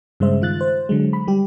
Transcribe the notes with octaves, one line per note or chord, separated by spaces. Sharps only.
G2 C#3 G#3 C5 E5
D#3 F4 F#6 A6
C5
D3 F#3 G#3
B5
G3 G4